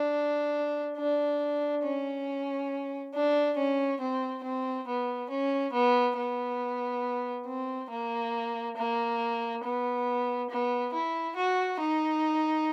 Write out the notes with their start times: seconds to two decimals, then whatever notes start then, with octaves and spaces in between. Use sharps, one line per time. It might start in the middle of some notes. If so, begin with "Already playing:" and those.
Already playing: D4
0.97 D4
1.83 C#4
3.14 D4
3.57 C#4
4.00 C4
4.44 C4
4.87 B3
5.30 C#4
5.73 B3
6.17 B3
7.46 C4
7.91 A#3
8.77 A#3
9.64 B3
10.50 B3
10.93 E4
11.36 F#4
11.80 D#4